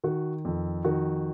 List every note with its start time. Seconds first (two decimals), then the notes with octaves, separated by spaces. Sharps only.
0.04 D#3 F#4
0.45 F2
0.85 D#3 F#4